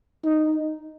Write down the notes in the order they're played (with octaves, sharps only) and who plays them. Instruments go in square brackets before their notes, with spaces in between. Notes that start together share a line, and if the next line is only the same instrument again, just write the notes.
[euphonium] D#4